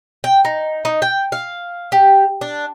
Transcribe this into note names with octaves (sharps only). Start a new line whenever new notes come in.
G5
D#4
D#4
G5
F5
G4
D4